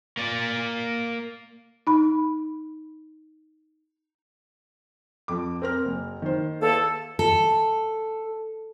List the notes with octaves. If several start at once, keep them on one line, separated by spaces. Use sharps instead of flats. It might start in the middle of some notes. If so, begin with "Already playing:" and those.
A#3 D5
D#4 B5
F2 D6
C4 A#4 F6
F#1
D#3 C5
E2 A#3 A4
A4